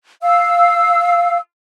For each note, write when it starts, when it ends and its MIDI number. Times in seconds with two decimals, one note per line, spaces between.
0.22 1.38 77
0.22 1.38 88